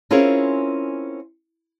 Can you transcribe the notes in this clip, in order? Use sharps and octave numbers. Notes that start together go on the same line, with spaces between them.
C4 C#4 E4 F4 G#4 A#4